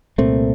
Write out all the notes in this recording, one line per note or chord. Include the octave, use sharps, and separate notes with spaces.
C2 A#2 A3 C4